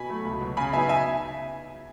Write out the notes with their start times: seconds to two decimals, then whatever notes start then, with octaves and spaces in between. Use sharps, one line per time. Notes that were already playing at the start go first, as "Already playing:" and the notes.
Already playing: B2 G#5 B5
0.09 F#3 A3
0.24 C#2
0.41 B2 F#3
0.57 C#3 G#5 B5
0.73 F#3 B3 D#4 E5 G#5
0.89 E5 G#5